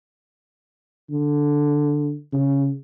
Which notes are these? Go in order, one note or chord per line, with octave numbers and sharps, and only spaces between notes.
D3
C#3